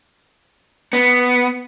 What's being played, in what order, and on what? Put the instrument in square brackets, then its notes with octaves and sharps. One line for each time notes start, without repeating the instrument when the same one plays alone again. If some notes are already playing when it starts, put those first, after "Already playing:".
[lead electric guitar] B3